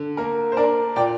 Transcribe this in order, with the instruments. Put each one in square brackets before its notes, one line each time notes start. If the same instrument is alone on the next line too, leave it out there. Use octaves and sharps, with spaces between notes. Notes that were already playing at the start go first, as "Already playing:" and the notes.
Already playing: [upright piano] D3
[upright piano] A#3 [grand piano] A#4
[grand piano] C5
[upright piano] D4 [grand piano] A#4 D5
[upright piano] A#2 [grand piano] D5 G5